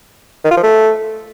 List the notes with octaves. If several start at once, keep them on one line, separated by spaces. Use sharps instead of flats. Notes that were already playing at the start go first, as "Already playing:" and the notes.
D#3
F4
F3
A3